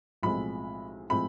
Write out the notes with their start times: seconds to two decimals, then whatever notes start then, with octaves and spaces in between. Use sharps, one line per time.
0.23 B1 A2 F3 G#3 C4 B5
1.10 A2 F3 G#3 C4 B5